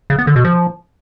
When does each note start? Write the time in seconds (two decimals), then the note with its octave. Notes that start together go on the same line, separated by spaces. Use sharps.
0.10 C#3
0.19 B3
0.27 D3
0.36 B2
0.44 F3